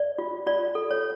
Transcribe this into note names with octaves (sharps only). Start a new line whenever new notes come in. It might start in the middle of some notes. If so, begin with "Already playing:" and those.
Already playing: D5
F4
F4 D5
A4
C#5